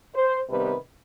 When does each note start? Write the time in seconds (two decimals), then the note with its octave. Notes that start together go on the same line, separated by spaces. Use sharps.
0.15 C5
0.49 C3 D#3 G3 B3 B4